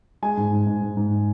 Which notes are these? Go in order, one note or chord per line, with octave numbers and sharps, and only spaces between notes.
G#3 G#5
G#2
G#2
G#2
G#2
G#2